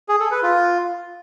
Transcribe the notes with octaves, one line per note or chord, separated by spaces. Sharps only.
G#4
A4
B4
F4